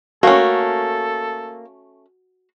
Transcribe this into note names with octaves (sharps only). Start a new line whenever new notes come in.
A3 A#3 C#4 F#4 A4